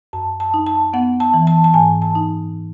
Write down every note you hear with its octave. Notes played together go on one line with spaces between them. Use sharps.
F#2 A5
A5
D#4
A5
B3 F#5
A5
E3
A5
A5
G#2 G#5
A5
D#4